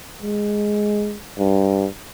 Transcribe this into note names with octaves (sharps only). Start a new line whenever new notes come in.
G#3
G2